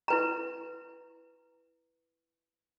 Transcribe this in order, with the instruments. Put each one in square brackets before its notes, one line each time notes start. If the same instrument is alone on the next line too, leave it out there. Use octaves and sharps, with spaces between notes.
[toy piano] E4 B4 A#5